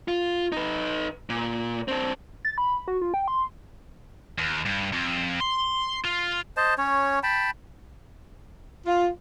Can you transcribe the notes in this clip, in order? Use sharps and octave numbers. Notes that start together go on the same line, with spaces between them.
F4
D#4 B4
A#2
C4 D4
A6
B5
F#4
F4
G5
C6
D#2
G2
F2
C6
F4
C5 D#5 A5
C#4 C#5
G5 A5 B5
F4